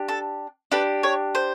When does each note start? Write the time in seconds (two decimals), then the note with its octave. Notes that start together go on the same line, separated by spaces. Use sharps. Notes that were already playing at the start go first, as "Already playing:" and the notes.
Already playing: D4 G4
0.08 A4
0.72 D4 G4 B4
1.03 C#5
1.35 C5